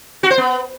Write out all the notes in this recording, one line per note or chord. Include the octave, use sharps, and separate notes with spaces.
F#4
C5
B3